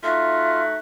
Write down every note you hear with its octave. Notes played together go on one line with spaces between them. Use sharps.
A3 D#4 F4 F#4 E5